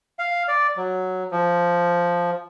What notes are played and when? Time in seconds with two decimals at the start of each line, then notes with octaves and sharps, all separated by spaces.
0.19 F5
0.48 D5
0.77 F#3
1.31 F3